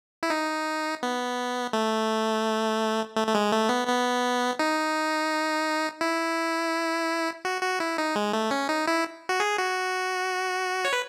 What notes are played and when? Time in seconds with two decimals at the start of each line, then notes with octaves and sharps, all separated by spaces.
0.23 E4
0.30 D#4
1.03 B3
1.73 A3
3.16 A3
3.27 A3
3.35 G#3
3.52 A3
3.69 B3
3.87 B3
4.59 D#4
6.01 E4
7.45 F#4
7.62 F#4
7.80 E4
7.98 D#4
8.16 G#3
8.33 A3
8.51 C#4
8.69 D#4
8.88 E4
9.29 F#4
9.40 G#4
9.58 F#4
10.85 C#5
10.93 B4